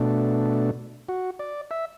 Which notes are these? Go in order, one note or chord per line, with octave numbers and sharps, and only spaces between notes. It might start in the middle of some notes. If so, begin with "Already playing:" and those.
Already playing: B2 A3 D4
F#4
D5
E5